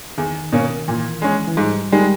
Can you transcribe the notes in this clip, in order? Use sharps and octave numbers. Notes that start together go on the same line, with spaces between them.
E2 D#3
B2 A#3 C#4
A#2 E3
G#3 C#4
E3
G#2 G3
D#3 G3 G#3